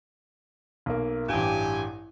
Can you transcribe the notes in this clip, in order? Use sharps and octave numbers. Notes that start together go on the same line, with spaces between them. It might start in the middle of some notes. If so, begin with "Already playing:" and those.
B1 A#3
A1 G2 G4 G#5